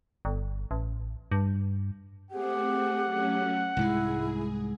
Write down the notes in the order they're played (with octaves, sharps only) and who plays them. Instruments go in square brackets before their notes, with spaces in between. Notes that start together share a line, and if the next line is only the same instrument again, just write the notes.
[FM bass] G1
A1
G2
[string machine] A3 C4 G#4 [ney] G4 [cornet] F#5
[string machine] F#3 A3 C#4
[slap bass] C2 G#2 G#3 [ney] E4 [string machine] G#4